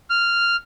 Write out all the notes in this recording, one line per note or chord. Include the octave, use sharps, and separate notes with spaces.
F6